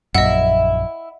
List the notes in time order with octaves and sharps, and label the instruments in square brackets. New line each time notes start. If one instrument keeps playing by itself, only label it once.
[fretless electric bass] A#1 F#2 [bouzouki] E4 [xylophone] D#5 F#5